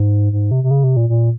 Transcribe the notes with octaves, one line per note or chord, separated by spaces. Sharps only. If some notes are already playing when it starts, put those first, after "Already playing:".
Already playing: G#2
G#2
C3
C3
C#3
C3
A#2
A#2